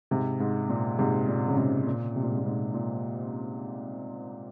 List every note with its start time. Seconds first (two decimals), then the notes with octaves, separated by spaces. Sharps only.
0.11 G#2 C3
0.40 G#2
0.70 A#2
0.99 G#2 C3
1.28 A#2
1.48 C#3
1.57 G#2 C3
1.87 A#2
2.16 C3
2.23 A#2
2.30 G#2
2.38 A#2
2.45 G#2
2.74 A#2